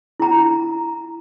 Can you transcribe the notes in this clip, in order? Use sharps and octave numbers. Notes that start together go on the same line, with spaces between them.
E4 A#5